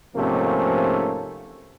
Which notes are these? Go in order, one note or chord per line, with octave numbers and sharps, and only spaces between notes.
G#2 C3 F3 A3 A#3 C#4